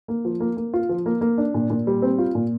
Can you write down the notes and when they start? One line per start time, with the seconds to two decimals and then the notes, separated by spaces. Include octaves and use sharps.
0.08 A#3
0.25 F3
0.40 A#3
0.57 A#3
0.74 F4
0.89 F3
1.06 A#3
1.21 A#3
1.38 D4
1.54 A#2
1.70 A#2
1.87 G3
2.02 C4
2.19 F4
2.35 A#2